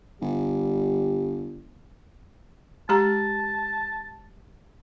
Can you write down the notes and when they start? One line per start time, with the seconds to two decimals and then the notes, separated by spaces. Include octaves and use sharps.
0.22 G1 G3
2.89 G#3 G4 A5 A#5